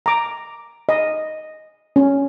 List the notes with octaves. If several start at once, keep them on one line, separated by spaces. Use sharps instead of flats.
A#5 D6
D#5
C#4